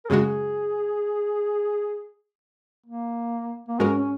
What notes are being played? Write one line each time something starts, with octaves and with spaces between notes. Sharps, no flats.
A#4
F#2 C#3 G#3 F#4 G#4
A#3
A#3
G#2 G#3 C#4 F#4 A#4
C#4